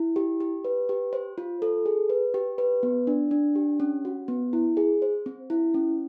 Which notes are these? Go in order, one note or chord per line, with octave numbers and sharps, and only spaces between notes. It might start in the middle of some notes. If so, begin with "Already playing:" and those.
Already playing: E4
G4
G4
B4
G4
C5
F4
A4
G#4
B4
G4
B4
B3
D4
D4
G4
C#4
F#4
B3
E4
G#4
C5
C4
E4
C#4